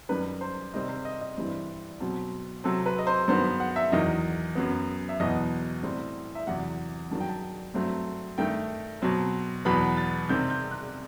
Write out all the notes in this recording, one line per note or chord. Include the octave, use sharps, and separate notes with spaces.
F#2 D#3 G3 B4
C5
C3 D#3 G3 C4 D#5
C5
D#5
D#5
G2 E3 G3 C4
B2 F#3 C4
C3 F#3 C4 A4
B4
D#5
C5
G2 D#3 F#3 B3 C5
F#5
E5
E2 D#3 F#3 D#5
F#2 F#3 B3
E5
E2 B2 F#3 B3 D#5
A2 G3 C4
E5
E2 C3 F#3 F#5
G2 D#3 F#3 A5
G5
A5
G2 F#3 A3 C4
G2 D#3 A3 G5
B2 F#3 C4
E2 B2 F#3 B3 B5
A6
C3 D#3 G3 C4 G6
G6
F#6